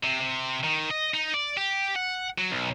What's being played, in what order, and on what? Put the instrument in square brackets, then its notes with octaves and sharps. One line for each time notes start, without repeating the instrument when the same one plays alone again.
[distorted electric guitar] C3
C3
D#3
D#5
D#4
D5
G4
F#5
F#3
B1